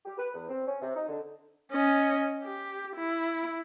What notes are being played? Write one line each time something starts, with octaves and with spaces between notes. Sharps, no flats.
G4
B4
E2
C4
C#4
C3
D#4
D3
C#4 D#5
G4
E4